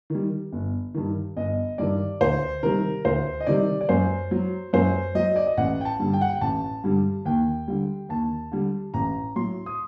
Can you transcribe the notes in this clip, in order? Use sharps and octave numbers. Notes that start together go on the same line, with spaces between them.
D#3 G3
G1
G2 D#3
G1 D#5
G2 D#3 D5
D2 C5
C3 D#3 G3 A#4
D2 C5
D#5
C3 D#3 G3 D5
D5
F#2 C5
F#3
F#2 C5
F#3 D#5
D5
D#5
A1 F#5
G5
A5
G2 D3 G3
G5
F#5
G5
A1 A5
G2 D3 G3
D#2 G5
D3 G3
D#2 A5
D3 G3
A1 A#5
A2 F#3 C6
D#6